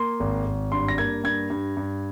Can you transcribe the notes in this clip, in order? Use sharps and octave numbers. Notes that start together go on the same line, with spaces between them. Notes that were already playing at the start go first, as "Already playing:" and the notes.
Already playing: A#3 C6
G#1
G#1
G2 C6
A#6
A#3 G#6
G2 G#6
G2
G2